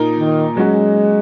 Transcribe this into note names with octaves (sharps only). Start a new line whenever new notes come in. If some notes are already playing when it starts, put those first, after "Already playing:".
Already playing: A#2 A#3 D#4 A#4
D#3
F#3 G#3 C#4 F#4